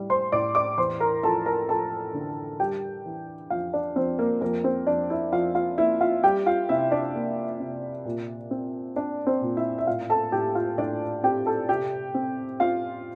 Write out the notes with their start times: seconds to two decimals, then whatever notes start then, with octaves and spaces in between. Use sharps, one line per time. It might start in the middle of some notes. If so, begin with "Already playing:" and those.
Already playing: A2 G3
0.10 C5 C6
0.32 A2 D5 D6
0.55 D5 D6
0.78 E2 C5 C6
1.00 A#4 A#5
1.23 F3 A4 A5
1.46 A#4 A#5
1.69 F3 A4 A5
2.14 D3
2.60 G3 G4 G5
3.06 E3
3.50 F2 F4 F5
3.73 D4 D5
3.96 F2 C4 C5
4.19 A#3 A#4
4.41 F2 A#3 A#4
4.64 C4 C5
4.87 F2 D4 D5
5.10 E4 E5
5.32 F2 F4 F5
5.55 F4 F5
5.78 A#3 E4 E5
6.01 F4 F5
6.23 G3 G4 G5
6.46 F4 F5
6.69 C3 E4 E5
6.91 D4 D5
7.15 A#3
7.60 C3
8.05 A#2
8.51 C4
8.96 C4 D4 D5
9.27 C4 C5
9.42 A#2
9.57 E4 E5
9.78 E5
9.87 A2 F4 F5
10.10 A4 A5
10.32 A2 G4 G5
10.55 F4 F5
10.78 A2 D4 D5
11.23 C4 G4 G5
11.46 A4 A5
11.69 C3 G4 G5
12.14 C4
12.60 C4 F4 F5